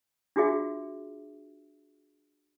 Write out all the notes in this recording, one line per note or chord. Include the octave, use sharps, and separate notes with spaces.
D4 F4 F#4 G#4 E5